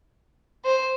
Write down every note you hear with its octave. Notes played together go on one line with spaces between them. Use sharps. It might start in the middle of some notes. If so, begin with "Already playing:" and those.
C5